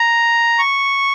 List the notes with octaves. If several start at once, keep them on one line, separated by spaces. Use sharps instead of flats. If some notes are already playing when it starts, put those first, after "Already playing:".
Already playing: A#5
C#6